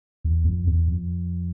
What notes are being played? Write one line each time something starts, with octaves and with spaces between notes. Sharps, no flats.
E2
F2
E2
F2